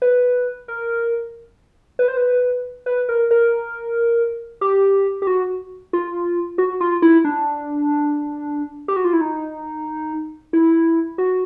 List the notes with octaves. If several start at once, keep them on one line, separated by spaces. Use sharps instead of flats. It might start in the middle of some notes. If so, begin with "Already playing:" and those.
B4
A#4
B4
C5
B4
B4
A#4
A#4
G4
G4
F#4
F4
F#4
F4
E4
D4
G4
F#4
F4
E4
D#4
E4
F#4